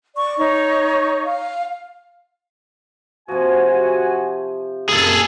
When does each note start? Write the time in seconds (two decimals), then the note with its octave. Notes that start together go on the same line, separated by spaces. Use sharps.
0.16 D5 C#6
0.39 D#4 C#5 C#6
1.26 F5
3.28 C3 F3 F#4 G#5
4.89 F#2 G3 A#3 C4 G#4 A4